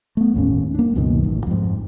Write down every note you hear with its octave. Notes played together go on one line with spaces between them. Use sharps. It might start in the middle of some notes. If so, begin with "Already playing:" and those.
A3 B3
G1 D#2 A2 C#4
A#3 D4
C#2 F#2 B2 D#3
A1
F2 G#2